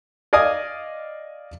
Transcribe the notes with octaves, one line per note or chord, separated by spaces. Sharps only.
D5 D#5 F5 G#5 D#6